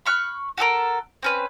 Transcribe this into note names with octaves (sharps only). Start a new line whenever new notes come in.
B5 C#6 F6 F#6
F#4 G4 A4 A#4
C4 C#4 B4